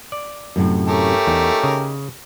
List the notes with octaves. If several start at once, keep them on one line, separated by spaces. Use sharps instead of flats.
D5
F#2 A2 C3
A3 C#4 G4 A#4
E2 D#4
C#3